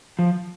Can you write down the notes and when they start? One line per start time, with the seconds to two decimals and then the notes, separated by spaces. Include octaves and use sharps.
0.19 F3